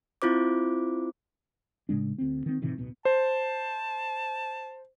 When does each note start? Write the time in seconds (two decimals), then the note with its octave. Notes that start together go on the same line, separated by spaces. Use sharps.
0.22 C4 E4 F4 C5 D6
1.89 A2 C#3 G#3 D4
2.18 D2 C4
2.46 D#3 C4
2.62 A2 C3 D#3 E3
2.78 D1 B1 B2
3.05 C5 A5